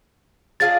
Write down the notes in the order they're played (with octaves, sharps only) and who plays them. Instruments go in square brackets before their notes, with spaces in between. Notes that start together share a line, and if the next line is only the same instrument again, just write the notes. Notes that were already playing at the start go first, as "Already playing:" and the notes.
[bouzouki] D4 F4 G#4 [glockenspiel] A6